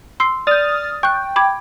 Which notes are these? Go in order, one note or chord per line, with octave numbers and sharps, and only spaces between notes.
C6 E6 C7
D5 D#6 F6 G6 A6
G5 C#6 F#6
B5 D6 G#6